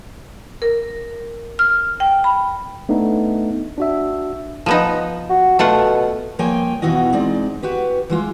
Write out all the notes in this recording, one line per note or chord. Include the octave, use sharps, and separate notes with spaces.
A#4
F6
G5
B5
A3 B3 D4 D#4
D4 F#4 E5
F3 B3 D#4
F#4
B2 A3 F4 F#5
F3 A#3 C#5 G5 G#5
E2 B2 E3 F4 F#4 D#5
G#3 C4 D#4 D5
F#4 G4 B4
E3 G#3 F4